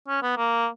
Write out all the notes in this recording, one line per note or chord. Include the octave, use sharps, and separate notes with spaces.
C#4
B3
A#3